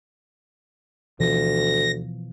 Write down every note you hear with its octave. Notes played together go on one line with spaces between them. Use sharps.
D2 B2 E3 F3 A#6